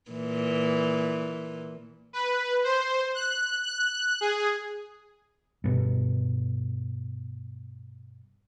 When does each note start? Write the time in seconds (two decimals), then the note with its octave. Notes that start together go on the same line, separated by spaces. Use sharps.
0.11 A#2 E3
2.13 B4
2.64 C5
3.15 F#6
3.63 F#6
4.21 G#4
5.64 G2 B2